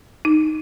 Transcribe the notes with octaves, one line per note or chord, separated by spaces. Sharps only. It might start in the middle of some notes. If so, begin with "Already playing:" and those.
D#4